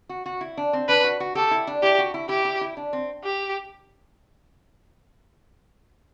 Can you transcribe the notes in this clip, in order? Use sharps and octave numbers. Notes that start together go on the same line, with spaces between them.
F#4
F#4
E4
D4
C4
D4 B4
F#4
F#4
G4 A4
E4
D4
E4 G4
F#4
E4
E4 G4
E4
E4
D4
C4
G4